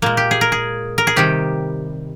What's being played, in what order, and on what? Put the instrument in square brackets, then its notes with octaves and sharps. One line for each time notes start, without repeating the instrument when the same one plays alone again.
[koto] A#2 G#3 A#3
G4
G#4
A#4
G#4
A#4
G#4
C3 D#3 G3 G4